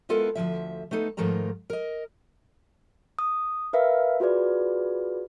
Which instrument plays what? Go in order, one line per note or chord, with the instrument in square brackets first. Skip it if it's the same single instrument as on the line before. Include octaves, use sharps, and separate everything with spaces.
[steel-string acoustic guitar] G#3 B3 E4 F4 A4 A#4
D2 G#2 F3 E5
A3 B3 D#4 A4
G#2 D#3 F3 A3 A#4 A#5
A#4 D#5
[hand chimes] D#6
A#4 B4 E5 F5
F4 F#4 G#4 B4 D5